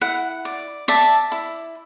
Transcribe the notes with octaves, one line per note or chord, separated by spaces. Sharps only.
E4 F#5
D5
D5 E5 A5
E4